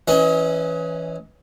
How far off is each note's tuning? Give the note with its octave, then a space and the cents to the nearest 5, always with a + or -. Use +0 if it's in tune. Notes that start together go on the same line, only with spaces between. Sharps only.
E3 +0 C#4 +0 D#5 +30